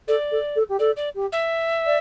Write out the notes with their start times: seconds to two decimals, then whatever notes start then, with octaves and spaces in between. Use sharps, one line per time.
0.08 A4 D5
0.31 A4
0.56 A4
0.69 G4
0.79 A4 D5
0.97 D5
1.15 G4
1.32 E5
1.86 D5